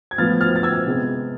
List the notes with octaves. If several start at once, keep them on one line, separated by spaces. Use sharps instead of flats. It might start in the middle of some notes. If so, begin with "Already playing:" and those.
G#6
A2 F3 B3 F6 A6
F6 A6
A6
E6 G#6
C3 G#3 B3